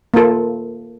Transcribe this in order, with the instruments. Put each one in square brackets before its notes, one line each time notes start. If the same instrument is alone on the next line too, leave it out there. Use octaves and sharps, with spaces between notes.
[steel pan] A#3 F4 A4